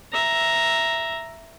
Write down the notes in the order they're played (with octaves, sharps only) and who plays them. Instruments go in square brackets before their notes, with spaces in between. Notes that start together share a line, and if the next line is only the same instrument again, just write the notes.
[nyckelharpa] E5 A#5